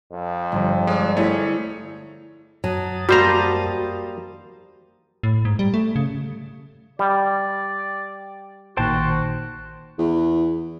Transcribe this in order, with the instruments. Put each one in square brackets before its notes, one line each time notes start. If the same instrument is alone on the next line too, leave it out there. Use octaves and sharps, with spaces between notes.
[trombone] F2
[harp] G1 F3 G3
[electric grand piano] G#3 [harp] D5 F5 D#6
[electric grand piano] A3 C#5 [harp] E4 G#4 B6
[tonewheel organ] F#2 A5 D#6 [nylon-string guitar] F#3
[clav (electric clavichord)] G3 C5 A#5 [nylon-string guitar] A#3 G4 [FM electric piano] F#4
[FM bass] A2
G#2
G3
A3
C#3
[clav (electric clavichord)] G3 [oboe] D5 [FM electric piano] G5
[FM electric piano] A1 A#2 D#3 [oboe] F#4 [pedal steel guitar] C5 G5 A5
[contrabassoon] E2